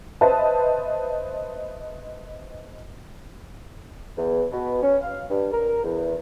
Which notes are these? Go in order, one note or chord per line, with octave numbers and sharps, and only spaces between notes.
B4 C5 D#5 E5 A5
E2
B2
C#4
F5
G2
A#4
E2